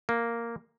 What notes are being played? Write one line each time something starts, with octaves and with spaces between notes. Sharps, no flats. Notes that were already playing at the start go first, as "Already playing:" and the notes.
A#3